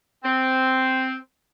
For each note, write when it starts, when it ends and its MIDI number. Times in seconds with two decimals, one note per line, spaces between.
0.24 1.13 60